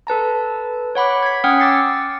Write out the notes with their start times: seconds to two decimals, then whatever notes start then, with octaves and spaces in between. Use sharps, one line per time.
0.07 A4 B4 A5 A#5
0.95 C#5 F#5 B5 D6
1.23 G#6 B6
1.44 C#4 F#5 G5 D#6 F6
1.59 D6 E6 A6 C7 C#7